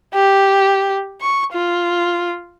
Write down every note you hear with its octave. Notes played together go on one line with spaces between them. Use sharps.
G4
C#6
F4